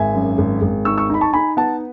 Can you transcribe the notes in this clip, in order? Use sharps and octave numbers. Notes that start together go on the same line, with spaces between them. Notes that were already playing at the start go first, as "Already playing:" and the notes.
Already playing: G#1 E5 G#5
F#2
G#1
G#1
D#4 C#6 E6
C#6 E6
D#4 B5
A5 C#6
D#4 G#5 B5
B3 F#5 A5